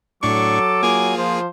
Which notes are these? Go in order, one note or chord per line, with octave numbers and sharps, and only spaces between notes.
A2 F#3 D4 A4 C#6 D6
A#3 F4 G#4 G#5
F3 C5